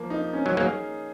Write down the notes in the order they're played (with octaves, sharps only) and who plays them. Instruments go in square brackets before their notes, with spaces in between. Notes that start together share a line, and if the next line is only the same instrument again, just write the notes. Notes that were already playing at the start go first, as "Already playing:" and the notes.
Already playing: [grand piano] F3 A#3
D#4
C#4
[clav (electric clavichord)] F#3
[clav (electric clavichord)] F#3 A#3 [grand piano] G#4